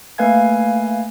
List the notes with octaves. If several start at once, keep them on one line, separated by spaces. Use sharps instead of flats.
A3 A#3 B4 F5 G#5 G#6